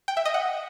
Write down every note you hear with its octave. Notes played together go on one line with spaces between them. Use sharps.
G5
E5
D#5
F#5